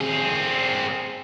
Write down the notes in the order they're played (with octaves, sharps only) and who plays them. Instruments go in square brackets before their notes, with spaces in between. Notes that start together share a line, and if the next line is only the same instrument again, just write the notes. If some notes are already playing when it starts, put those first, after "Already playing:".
[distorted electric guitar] C4 G#4